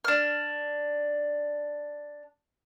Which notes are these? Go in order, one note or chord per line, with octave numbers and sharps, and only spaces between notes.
D4 F6